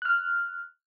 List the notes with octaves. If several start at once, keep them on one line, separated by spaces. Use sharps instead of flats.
F6 F#6